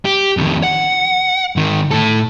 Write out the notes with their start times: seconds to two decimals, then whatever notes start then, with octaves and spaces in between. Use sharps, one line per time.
0.05 G4
0.37 F2 D#3
0.63 F#5
1.56 G#2 D#3
1.91 A2 A4